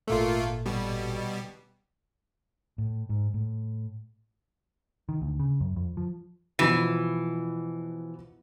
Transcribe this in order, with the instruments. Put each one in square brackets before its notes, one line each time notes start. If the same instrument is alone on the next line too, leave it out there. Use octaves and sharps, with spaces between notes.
[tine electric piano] G#1 A#2 A4 [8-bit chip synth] A3 A#3 F4
[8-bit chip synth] B2 G3
[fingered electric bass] A2
G#2
A2
[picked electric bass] D#3
D2
C#3
F#2
F2
F3
[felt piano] B2 F3 F#4 [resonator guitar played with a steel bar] E3